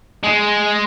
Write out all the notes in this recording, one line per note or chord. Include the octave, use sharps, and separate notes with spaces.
G#3